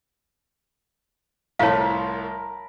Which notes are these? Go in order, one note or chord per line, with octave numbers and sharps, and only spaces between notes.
C2 A2 F3 A#4 C#5 F5 A5 B5